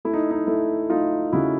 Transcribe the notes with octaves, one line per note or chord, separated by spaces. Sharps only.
A3 E4
D#4
D#4
A3 E4
A3 D#4 F4
C#3 E4 F#4